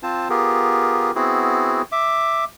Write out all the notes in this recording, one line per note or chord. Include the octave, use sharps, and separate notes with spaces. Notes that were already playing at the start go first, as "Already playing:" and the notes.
C4 F4 C5 A5
B3 F4 G4 G#4 A#4
B3 C4 E4 F#4 G#4
E5 D6